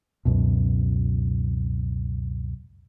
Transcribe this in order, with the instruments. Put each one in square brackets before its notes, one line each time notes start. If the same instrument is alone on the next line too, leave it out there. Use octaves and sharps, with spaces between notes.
[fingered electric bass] C#2 F#2 B2